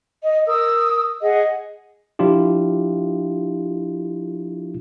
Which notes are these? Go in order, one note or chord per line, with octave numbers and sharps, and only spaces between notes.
D#5
A#4 D#6 E6
G#4 D#5 F#5
F3 D4 E4 F4 G4